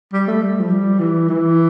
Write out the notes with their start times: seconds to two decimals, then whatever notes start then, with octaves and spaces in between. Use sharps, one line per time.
0.13 G3
0.28 A3
0.42 G3
0.60 F3
0.70 G3
0.99 E3
1.29 E3